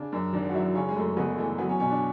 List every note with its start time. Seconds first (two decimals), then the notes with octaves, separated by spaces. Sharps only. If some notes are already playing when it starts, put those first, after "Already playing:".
Already playing: C#3 D4
0.12 F#2 D4
0.33 G#1 D4
0.49 F#4
0.54 F#3 E4
0.75 C#3 C#4
0.89 G#3
0.96 F#2 A3
1.17 F#1 B3
1.38 E3 A3
1.58 F#3 B3
1.69 C#4
1.80 B2 C#4
1.90 D4